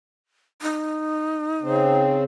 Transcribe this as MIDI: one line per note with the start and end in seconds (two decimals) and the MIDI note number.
0.62 2.16 63
1.62 2.24 49
1.62 2.24 60